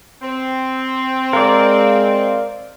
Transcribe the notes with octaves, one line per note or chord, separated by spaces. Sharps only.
C4
G#3 A#4 D5 F5